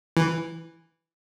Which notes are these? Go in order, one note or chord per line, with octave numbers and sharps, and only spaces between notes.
E3